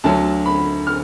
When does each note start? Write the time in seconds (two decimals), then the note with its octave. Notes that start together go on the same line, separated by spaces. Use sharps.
0.04 D2 D3 F#3 A5
0.46 B5
0.87 F6